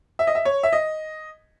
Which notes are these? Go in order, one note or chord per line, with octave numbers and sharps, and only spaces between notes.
E5
D#5
E5
C#5
E5
D#5